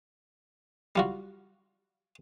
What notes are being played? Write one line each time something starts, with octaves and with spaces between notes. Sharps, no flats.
G3 F4 F#4